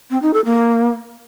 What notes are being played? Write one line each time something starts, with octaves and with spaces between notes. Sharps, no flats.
C4
D#4
A4
A#3